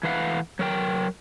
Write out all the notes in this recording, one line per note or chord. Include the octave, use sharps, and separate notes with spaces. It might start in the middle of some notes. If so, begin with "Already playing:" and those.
E3 A3 B4 F5 F#5
F#3 A#4 G5